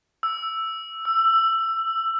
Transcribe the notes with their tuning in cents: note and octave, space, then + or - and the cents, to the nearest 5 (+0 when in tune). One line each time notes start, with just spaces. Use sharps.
E6 +5
E6 +15